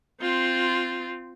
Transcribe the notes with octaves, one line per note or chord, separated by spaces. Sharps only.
C4 F4